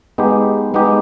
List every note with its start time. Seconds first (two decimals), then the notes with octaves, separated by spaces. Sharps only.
0.18 G#3 B3 D#4 G4
0.74 G#3 B3 D#4 G4